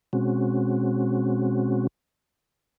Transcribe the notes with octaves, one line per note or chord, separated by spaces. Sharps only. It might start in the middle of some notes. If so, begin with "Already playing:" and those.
B2 G#3 C4 C#4 F#4